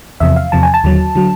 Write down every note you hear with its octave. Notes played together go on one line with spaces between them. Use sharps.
E2 C3 F3 E5
F5
E2 C3 F3 A5
G#5
A5
D#2 D3 F#3
D3 F#3